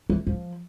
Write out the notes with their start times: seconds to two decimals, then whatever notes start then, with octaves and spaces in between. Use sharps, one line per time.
0.10 E3
0.27 F3